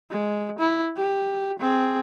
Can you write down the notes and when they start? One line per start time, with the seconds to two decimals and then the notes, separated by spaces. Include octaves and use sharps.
0.11 G#3
0.59 E4
0.97 G4
1.59 C4 G#4